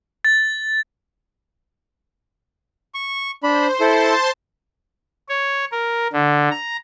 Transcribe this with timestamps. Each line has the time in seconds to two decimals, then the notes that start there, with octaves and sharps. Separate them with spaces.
0.25 A6
2.94 C#6
3.43 D4 C5 B5
3.80 E4 A4 C5 A5 C6
5.29 C#5
5.72 A#4
6.13 D3
6.51 A#5